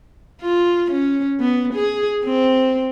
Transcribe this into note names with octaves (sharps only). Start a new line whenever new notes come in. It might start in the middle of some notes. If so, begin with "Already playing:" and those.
F4
C#4
B3
G#4
C4